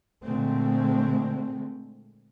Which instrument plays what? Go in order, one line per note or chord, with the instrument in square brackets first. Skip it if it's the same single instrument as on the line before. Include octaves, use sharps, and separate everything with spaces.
[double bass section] A#2 D3 G#3 A3 C4